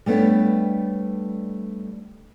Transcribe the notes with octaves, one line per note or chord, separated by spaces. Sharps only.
G3 A3 B3 D4 C#5